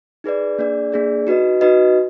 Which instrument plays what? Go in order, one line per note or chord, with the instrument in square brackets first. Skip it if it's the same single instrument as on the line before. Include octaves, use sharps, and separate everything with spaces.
[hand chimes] D#4 G#4 B4 D5
A#3 D4 G#4 D5
A#3 D4 G#4 D5
D#4 F#4 B4 D#5
D#4 F#4 B4 D#5